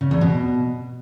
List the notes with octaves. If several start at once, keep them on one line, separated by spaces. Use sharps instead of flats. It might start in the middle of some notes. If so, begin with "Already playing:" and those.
C#3
E2
B2